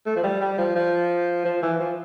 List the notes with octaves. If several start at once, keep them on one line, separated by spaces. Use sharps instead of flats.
A3
F3
G3
G3
F3
F3
F3
E3
F3